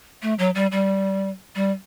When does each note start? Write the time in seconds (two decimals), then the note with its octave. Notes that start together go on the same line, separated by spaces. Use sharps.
0.22 A3
0.39 F#3
0.55 G3
0.72 G3
1.55 G3